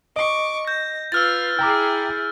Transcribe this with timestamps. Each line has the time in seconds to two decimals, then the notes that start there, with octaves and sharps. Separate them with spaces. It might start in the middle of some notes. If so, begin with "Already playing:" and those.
0.16 D#5 C#6 D6
0.67 G6 A#6
1.12 F4 B4 E6 F6 A6
1.59 E4 G#4 G5 A#5 D6